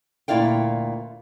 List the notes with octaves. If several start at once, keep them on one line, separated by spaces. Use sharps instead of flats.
D2 A#2 E4 D5 F5 G5